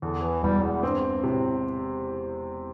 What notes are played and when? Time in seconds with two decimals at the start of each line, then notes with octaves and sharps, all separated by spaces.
0.02 E2 D3
0.22 E3
0.43 E1 G3
0.63 E2
0.83 G2 C4
1.23 A2 C3